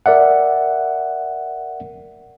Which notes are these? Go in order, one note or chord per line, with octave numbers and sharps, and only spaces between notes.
A#4 D5 E5 F#5